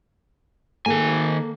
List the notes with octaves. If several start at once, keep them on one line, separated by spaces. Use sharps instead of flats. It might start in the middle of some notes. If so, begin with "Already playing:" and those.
D#3 A#3 G#4 A4 G#5